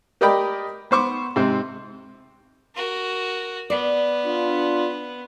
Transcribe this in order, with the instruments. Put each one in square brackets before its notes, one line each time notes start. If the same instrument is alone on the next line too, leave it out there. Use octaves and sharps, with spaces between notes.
[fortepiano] G4 A#4 D5 D#5 G5 B5
B3 C5 C#6 D6
G#2 C3 C4
[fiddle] F#4 A#4
[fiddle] B3 [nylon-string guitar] D5
[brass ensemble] D4 F4